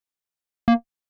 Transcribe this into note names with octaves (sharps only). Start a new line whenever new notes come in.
A#3